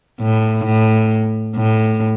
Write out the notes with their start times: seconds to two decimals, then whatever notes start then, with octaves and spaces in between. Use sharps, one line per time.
0.21 A2
0.65 A2
1.56 A2